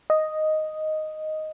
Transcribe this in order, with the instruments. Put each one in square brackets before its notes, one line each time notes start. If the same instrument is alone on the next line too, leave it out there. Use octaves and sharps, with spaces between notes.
[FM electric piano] D#5